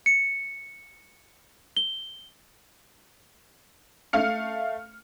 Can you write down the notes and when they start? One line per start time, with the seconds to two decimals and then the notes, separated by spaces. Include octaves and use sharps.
0.06 C#7
1.77 G7
4.13 A3 F5 F6 C#7